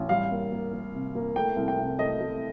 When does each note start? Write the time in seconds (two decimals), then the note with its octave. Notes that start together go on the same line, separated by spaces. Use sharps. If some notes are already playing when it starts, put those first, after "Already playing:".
Already playing: A1
0.09 G3 F5
0.31 A#3
0.52 A#3
0.73 A#3
0.94 C3
1.15 A#3
1.36 A3 G5
1.56 C2
1.68 G5
1.78 C3
1.98 A3 D#5
2.21 A3